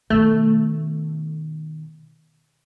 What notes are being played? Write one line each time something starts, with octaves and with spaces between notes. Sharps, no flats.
B2 D#3 A3